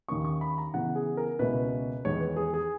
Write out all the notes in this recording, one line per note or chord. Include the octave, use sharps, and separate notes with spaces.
D#2 D#3 A#3 C#4 C#6
C#6
B5
A#5
C#3 E3 B3 F#5
G#4
A#4
C#2 B2 A#3 C#4 E4 B4
E2 D#3 G#3 C#5
B4
G#4
G#4